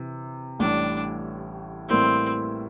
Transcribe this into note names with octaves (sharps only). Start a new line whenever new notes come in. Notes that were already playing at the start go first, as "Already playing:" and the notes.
Already playing: C3 E3
A1 A2 G3 D4
A2 E3 G3 A#3 C4 E4